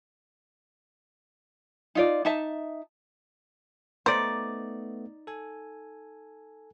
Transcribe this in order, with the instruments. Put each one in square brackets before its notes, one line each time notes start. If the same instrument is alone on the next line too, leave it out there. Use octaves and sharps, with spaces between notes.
[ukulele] D#4 F4 D5
D#4 E5 A5
[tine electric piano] A3 B3 [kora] D#4 D5 [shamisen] C5
[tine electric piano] A4 G#5